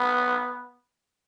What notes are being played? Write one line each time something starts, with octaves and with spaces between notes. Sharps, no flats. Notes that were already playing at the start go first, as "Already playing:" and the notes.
Already playing: B3